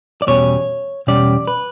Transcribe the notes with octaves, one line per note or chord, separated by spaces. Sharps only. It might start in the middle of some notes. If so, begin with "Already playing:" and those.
D5
E2 B2 G3 C#4 C#5
E2 B2 G3 C#4 D5
B4